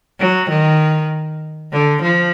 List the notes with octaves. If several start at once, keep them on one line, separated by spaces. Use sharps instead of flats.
F#3
D#3
D3
F3